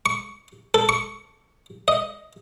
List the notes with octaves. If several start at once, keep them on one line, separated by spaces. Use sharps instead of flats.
C#6
A4
C#6
D#5